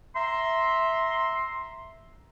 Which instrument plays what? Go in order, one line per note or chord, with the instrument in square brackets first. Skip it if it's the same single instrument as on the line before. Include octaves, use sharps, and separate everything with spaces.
[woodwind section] E5 A#5 C6